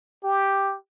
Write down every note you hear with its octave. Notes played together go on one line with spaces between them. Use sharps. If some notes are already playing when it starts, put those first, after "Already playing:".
G4